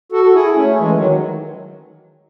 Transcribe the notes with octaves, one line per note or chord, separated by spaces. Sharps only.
F#4 A4
A4
E4 G#4
A3 C#4
E3 G#3
D#3 F#3